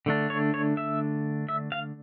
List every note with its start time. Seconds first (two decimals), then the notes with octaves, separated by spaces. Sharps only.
0.06 D3 A3 D4
0.30 C#5
0.54 C#5
0.77 E5
1.49 E5
1.72 F5